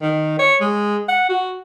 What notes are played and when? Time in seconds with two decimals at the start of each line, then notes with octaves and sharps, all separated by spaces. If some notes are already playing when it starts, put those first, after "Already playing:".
0.02 D#3
0.39 C#5
0.61 G#3
1.09 F#5
1.29 F#4